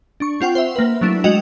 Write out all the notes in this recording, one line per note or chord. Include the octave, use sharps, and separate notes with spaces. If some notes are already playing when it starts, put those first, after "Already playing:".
D4 C#6
C4 F4 F#5 G5
C5 E5
A#3 B4
F#3 A3 D4 E4
G#3 F#4 D#5 G5 E7 F7